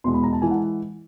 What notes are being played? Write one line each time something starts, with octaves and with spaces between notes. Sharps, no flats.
E2 B2 G#3 C6
B5
A#5
A5
E3 G#3 G#5
F#5